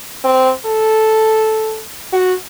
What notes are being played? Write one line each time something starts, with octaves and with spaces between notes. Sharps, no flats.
C4
A4
F#4